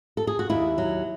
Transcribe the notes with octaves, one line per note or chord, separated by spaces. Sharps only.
A4
G#4
F#4
D#2 E4
F#3